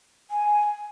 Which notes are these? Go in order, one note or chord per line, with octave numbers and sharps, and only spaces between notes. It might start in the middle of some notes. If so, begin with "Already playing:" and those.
G#5